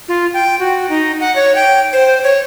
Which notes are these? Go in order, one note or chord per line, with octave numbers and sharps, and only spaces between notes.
F4
G5
F#4
D#4
F#5
C#5
G5
C5
C#5